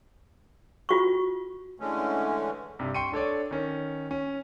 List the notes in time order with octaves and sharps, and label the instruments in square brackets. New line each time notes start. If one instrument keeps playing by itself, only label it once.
[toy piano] F4 F#4 C#6
[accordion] D3 E3 G#3 A3 C#4
[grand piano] G2 C3
G5 C6 C#6 C#7 D#7
D4 A4 C#5 D5
D#3 C#4
C#4